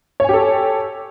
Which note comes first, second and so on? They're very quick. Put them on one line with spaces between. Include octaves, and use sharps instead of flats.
C#5 G#5 G4 A4